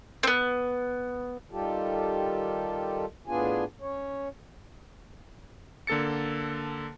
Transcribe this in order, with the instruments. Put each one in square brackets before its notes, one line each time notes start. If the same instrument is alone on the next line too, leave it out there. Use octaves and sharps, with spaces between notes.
[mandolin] B3 C4
[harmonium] D#3 G3 F4 G4 A4
A2 B3 D4 F4 G#4 G#5
C#4 C#5
[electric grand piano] D3 A#3 A4 A6 C#7